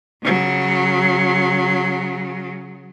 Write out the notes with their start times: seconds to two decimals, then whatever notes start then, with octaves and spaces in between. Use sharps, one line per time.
0.23 C#3 F#3